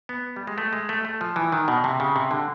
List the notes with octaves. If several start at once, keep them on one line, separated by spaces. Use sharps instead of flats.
B3
G3
G#3
A3
G#3
A3
A3
F3
E3
D#3
B2
C3
C#3
C3
D3